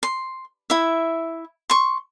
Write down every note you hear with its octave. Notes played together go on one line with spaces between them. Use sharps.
C6
E4 E5
C6 C#6